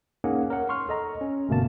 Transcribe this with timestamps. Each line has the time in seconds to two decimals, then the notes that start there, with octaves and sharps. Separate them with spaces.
0.24 A#3 C#4 D#4 G#4 F#5
0.50 A#4 C#5 F#5
0.69 C6 C#6 F6
0.89 A4 D#5 A#5
1.21 C#4
1.49 G1 B2 A3 A#3 A5